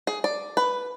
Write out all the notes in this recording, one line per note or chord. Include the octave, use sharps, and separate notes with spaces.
G#4
D5
B4